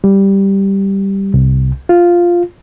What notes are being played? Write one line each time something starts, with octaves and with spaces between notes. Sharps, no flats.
G3
C2
F4